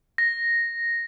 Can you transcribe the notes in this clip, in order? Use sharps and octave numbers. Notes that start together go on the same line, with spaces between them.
A#6